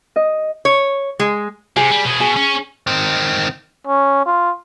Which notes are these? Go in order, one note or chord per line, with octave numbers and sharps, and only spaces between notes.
D#5
C#5
G#3
C3 G#4
G3
B2 G#4
B2 G#4
C#4
D#3 C4
C#4
F4